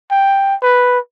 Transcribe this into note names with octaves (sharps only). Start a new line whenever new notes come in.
G5
B4